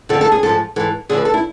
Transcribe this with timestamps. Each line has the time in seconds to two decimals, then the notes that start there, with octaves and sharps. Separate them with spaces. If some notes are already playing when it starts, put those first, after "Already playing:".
0.09 F2 D3 F3 A4
0.21 A4
0.32 G#4
0.43 G#2 F3 A4
0.76 G#2 E3 A4
1.09 D2 D3 F3 G#4
1.18 B4
1.25 A4
1.34 E4